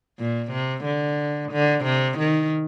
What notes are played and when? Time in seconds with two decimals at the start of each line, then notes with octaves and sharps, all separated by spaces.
0.19 A#2
0.51 C3
0.85 D3
1.52 D3
1.85 C3
2.18 D#3